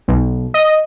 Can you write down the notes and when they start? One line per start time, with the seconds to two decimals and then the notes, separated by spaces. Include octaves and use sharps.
0.08 B1
0.54 D#5